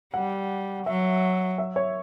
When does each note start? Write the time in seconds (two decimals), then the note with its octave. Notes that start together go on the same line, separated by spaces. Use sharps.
0.14 G3 F#5
0.86 F#3 E5
1.58 E5
1.76 C#5